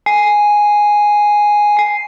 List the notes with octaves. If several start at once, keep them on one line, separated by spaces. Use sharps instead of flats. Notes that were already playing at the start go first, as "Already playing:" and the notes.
G#5 C7